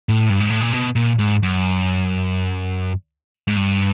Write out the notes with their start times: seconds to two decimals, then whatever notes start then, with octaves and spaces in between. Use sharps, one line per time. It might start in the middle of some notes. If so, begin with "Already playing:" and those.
0.09 A2
0.30 G2
0.40 G#2
0.50 A2
0.61 A#2
0.72 B2
0.95 A#2
1.19 G#2
1.43 F#2
3.48 G#2
3.56 G2